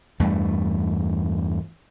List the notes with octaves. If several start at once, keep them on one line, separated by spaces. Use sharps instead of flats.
E2 G2 A3